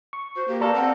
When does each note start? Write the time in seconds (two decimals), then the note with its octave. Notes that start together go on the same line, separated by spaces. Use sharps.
0.13 C#6
0.36 F#4 C5
0.48 A#3 G4
0.61 A4 B4 D5 F5 A#5
0.74 C4 F#5